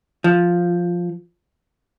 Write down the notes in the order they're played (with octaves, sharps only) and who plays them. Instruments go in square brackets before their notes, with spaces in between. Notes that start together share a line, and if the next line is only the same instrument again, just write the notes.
[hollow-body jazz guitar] F3